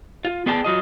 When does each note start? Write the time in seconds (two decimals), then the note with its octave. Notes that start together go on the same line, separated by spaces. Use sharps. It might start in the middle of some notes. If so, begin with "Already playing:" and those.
0.25 F4
0.46 B3 G#4 D5 G5 A5
0.64 F#3 F4 D#5